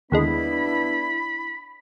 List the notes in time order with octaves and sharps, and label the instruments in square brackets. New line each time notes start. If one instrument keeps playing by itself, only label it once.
[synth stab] D#2 D3 G#3 [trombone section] B3 D4 [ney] E4 [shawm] B5